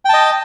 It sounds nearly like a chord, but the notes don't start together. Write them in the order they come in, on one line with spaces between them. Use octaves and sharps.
G5 A5 D#5